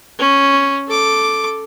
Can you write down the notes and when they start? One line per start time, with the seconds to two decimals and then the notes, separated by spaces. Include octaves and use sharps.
0.19 C#4
0.88 A4 D6